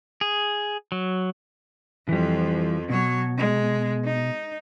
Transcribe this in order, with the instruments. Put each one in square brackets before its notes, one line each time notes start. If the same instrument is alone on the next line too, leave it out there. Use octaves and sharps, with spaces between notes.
[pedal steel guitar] G#4
F#3
[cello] F2 F3 [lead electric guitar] E3 G3
[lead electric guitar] B2 [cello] F#3 C#5
[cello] G#3
D#4